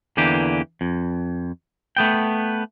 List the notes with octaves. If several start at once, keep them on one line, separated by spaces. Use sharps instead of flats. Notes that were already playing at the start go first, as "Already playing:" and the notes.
E2 D3 E3 A#3 G4
F2
A3 B3 G5